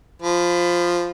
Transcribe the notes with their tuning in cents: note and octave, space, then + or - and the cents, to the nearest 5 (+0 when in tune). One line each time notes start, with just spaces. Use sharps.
F3 +0 B5 +20